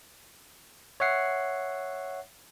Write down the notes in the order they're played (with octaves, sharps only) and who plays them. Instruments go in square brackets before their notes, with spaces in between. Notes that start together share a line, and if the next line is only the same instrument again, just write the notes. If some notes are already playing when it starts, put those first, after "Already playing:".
[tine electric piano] C#5 E5 F#5 C7